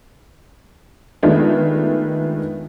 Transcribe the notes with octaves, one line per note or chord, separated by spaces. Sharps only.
D#3 G#3 A3 B3 D4 F4